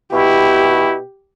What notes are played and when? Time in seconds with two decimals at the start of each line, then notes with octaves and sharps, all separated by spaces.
0.13 B2 E4 G4